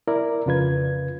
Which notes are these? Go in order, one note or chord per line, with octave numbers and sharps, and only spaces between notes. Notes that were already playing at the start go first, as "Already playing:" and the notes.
E4 A#4 D5
F2 C#3 F4 B4 G#6